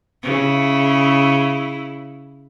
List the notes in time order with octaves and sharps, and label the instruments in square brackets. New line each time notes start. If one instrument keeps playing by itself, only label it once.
[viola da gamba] C#3 E4